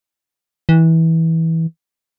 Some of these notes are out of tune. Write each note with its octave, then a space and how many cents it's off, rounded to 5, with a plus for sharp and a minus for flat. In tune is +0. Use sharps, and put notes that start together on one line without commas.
E3 -20